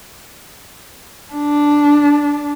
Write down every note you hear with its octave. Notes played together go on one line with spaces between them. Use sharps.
D4